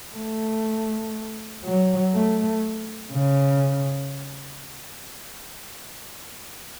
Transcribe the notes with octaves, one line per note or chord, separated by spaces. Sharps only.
A3
F#3
A3
C#3